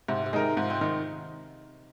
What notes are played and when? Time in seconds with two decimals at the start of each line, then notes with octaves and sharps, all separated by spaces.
0.08 G#2 C3
0.26 C3
0.33 D#3 G#3 D#4 A#4
0.57 G#2 F3
0.70 C4
0.81 D#3 D#4